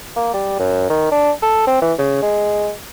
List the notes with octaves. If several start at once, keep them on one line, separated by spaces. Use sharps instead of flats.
A#3
G3
F#2
D#3
D4
A4
C4
E3
C#3
G#3